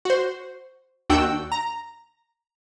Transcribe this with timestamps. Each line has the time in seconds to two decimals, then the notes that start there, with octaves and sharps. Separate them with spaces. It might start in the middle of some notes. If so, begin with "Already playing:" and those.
0.05 F#4 C5
1.10 D#2 D4 F#4 G5 E6
1.52 A#5